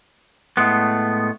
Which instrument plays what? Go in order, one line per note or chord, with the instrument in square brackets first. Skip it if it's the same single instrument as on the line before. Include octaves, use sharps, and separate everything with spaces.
[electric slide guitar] A2 G#3 A3 B3